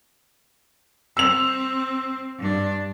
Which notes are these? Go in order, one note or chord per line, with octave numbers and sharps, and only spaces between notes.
C4 E6 F7
G2 D4